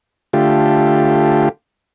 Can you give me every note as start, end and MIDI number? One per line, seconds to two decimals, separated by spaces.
0.33 1.49 50
0.33 1.49 57
0.33 1.49 65
0.33 1.49 67